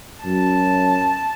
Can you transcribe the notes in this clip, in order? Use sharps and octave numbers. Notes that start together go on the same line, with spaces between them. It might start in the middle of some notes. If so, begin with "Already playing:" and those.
F#2 A5